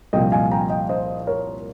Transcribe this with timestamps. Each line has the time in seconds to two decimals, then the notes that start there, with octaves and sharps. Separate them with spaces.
0.13 C2 A#2 F3 D#5 G5
0.32 F5 G#5
0.51 G5 A#5
0.70 D#5 G5
0.89 C5 D#5
1.27 A#4 C#5